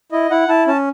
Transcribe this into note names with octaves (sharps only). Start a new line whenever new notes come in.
E4 D#5
E4 F#5
E4 A5
C#4 A5